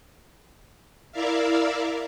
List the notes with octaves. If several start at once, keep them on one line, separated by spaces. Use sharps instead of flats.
E4 A#4 D5 E5 F5